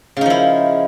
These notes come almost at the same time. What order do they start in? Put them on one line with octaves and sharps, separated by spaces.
C#3 D#4 F3 E4